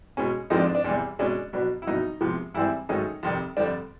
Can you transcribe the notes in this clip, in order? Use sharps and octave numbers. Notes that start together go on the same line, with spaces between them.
B2 G#3 C#4
F2 D3 F3 G#3 C4 D#4
D4
D4
E2 C3 E3 G3
B2 G#3 C#4 D4
B2 F#3 B3 D4
E4
C2 B2 F#3 B3 D#4
C3 F3 G#3 B3
G#2 E3 G3 C4 E4
G#2 D#3 F#3 A3 C#4 D#4
F2 C3 D#3 G3
F2 D3 G3 D4